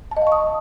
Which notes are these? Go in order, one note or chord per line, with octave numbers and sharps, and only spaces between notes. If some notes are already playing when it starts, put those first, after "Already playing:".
A5
D#5
F5
C#6
D#6